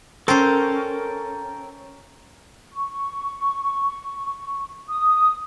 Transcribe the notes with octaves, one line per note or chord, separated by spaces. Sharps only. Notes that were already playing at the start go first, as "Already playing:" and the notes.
C#4 A4 A#4 C5 G5
C#6
D#6